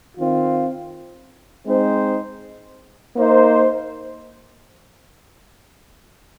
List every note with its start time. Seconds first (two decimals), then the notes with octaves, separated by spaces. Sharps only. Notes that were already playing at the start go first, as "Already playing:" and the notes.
0.16 D#3 C4 F4
1.66 G#3 C4 D#4 C5
3.16 A#3 D#4 C5